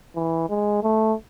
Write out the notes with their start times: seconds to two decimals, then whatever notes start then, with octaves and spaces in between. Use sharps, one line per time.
0.16 E3
0.50 G#3
0.83 A3